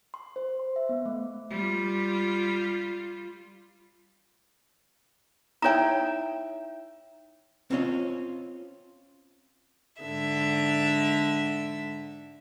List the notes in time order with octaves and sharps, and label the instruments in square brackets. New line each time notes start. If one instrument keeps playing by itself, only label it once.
[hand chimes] C6
C5
C6
E5
B3
A3
[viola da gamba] G3 F4
[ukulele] D#4 E4 G5 [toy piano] C#5 A#5
[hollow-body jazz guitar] C4 C#4 F4 C#5 D#5
[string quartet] G#2 D3 E5